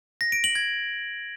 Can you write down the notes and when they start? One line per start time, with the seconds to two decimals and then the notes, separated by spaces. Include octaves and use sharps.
0.21 A#6
0.32 D7
0.44 F#7
0.55 G#6